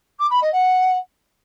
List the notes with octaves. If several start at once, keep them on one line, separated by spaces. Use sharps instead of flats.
D6
B5
D#5
F#5